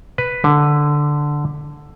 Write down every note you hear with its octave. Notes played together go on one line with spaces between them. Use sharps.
B4
D3